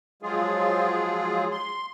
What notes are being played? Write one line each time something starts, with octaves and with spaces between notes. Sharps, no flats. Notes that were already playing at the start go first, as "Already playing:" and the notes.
F3 F#3 G#3 F4 G#4
C6